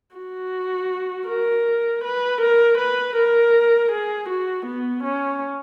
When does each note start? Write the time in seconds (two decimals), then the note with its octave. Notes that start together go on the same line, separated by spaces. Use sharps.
0.15 F#4
1.28 A#4
2.04 B4
2.41 A#4
2.78 B4
3.16 A#4
3.92 G#4
4.29 F#4
4.66 B3
5.04 C#4